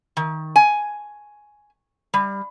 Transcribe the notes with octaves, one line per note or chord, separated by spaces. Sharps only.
D#3
G#5
G3